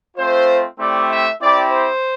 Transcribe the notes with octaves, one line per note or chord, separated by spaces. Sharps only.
A3 C4 F4 C5
A3 C4 E4 G4 D5
E5
C4 E4 G4 D5
C5